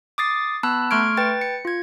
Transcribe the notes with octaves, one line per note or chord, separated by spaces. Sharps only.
D6 D#6 A6 C7
B3 A5 B5 E6 F#6
A3 C6 C#6 F6 G#6 D7
B4 G5 A6
C#7
F4 G#6